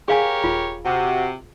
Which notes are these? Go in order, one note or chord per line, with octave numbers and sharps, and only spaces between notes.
G4 G#4 A#4 C#5 F5 G#5
D#1 F4
C3 F#4